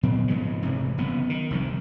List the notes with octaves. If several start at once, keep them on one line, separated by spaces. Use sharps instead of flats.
A#2 F#3 B3 C4
G#2 C#3 F3
F1 C3 E3
F#1 B3
D#3
F1 C2 F3